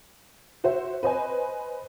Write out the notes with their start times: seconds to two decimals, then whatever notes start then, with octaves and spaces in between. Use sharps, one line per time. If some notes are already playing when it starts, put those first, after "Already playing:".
0.64 F#4 C5 E5
1.03 B4 C5 D#5 G#5